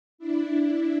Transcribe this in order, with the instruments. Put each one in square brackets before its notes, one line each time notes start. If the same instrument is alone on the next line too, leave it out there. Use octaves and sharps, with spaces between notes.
[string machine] D4 E4